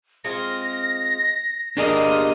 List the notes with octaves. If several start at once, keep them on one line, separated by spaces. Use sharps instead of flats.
G#3 C4 F4 A#6
A#3 D4 F4 G4 G#4 A#4 D#5